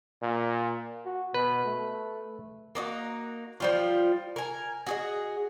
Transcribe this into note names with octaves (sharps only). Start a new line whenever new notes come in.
A#2
F#4
B2 B4
A3
A#3 D4 D#4 F#4
F3 G3 F4
A#4 G#5
F#4 G#4 D#5